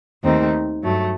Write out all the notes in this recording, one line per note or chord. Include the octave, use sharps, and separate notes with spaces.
D#2 D#3 A3 C4 D#4
G2 F#3 A3